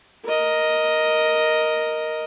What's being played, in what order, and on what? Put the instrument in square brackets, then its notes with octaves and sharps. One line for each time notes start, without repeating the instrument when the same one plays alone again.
[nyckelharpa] A#4 D#5